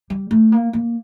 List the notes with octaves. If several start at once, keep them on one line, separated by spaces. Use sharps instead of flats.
G3
A3
A#3
A#3